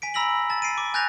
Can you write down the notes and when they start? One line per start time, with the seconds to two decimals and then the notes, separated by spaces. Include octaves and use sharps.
0.02 G#5 B6 D7
0.14 A#5 B5 E6 A#6 B6 F#7
0.50 A5 A6
0.62 C7 D7 D#7
0.78 D6
0.94 G#5 F#6 G6 A6 A#6 F7